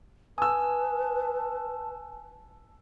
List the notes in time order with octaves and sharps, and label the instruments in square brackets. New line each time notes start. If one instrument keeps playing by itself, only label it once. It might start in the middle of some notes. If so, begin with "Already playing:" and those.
[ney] B4 [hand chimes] G#5 [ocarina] A5 [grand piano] D#6 E6